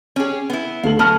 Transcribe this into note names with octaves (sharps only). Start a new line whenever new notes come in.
C#4 G4 G#4
B3 E4
D2 A4 F5 F#7
F#3 B3 A5 F6